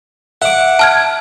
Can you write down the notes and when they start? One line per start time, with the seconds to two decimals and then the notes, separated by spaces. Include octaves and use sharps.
0.42 E5 F#5 D6
0.79 A5 F6 G#6